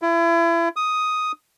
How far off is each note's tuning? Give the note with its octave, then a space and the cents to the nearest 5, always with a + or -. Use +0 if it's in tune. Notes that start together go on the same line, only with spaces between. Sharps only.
E4 +35
D#6 +5